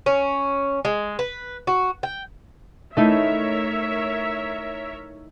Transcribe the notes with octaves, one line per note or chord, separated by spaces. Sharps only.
C#4
G#3
B4
F#4
G5
A3 D#4 E4 A#4 C#5 E5